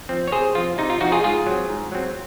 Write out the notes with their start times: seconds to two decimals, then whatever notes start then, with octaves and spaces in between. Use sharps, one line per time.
0.09 F3 C4
0.27 C#5
0.32 C3 G#4 C5
0.55 F3 C4 F4
0.78 C3 D#4
0.90 F4
1.00 F3 C4 D#4 F#4
1.12 F4 G#4
1.24 G#2 F4 G#4
1.46 F#3 C4
1.69 G#2
1.92 F#3 C4